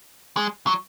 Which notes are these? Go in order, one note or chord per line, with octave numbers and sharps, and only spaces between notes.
G#3
F#3